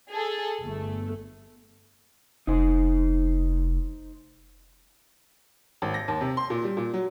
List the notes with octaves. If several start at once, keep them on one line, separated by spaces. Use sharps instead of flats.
G#4 A4
G1 A3
F1 D#4 C5
G#1
A#6
D#2
C3
C6
A#2
G3
A#2
F#3